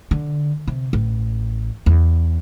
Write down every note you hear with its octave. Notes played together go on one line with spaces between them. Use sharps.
D3
C3
A1
E2